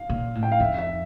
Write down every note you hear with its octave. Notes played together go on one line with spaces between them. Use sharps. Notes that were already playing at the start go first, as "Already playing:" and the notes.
Already playing: F5
A#2
A2
G5
F5
F2 E5
E5